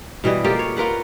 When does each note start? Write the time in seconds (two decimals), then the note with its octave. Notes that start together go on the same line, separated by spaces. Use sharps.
0.24 B2 E3 G3 D#5
0.44 A#3 F4 G4 A4
0.59 C#5
0.77 F4 A#4 B4 F#5